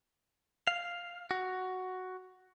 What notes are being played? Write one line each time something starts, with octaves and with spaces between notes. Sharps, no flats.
F5
F#4